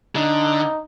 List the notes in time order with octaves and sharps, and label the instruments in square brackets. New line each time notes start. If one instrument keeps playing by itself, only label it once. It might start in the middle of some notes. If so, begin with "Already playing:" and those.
[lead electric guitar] D3 [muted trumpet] D#4